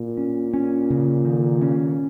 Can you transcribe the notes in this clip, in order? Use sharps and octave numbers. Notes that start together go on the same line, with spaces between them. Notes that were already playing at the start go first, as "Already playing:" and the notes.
Already playing: A#2
C#4
C#4
C#3
D#3
C#4